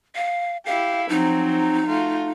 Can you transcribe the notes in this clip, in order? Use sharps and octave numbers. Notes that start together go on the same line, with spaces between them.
F5
E4 G4 F5
F3 F#3 C4 D#4
A3 F4 F#4